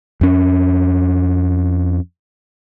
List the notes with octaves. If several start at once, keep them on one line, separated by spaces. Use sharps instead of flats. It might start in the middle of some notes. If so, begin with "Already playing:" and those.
F2 C#4